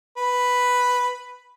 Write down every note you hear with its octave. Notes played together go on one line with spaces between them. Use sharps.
B4